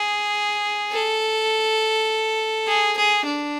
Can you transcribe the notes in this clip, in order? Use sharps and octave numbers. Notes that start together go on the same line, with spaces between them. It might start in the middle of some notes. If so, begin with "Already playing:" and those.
Already playing: G#4
A4
G#4
G#4
D4